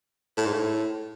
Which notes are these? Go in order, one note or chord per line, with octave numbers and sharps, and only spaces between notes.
A2
G#2
A2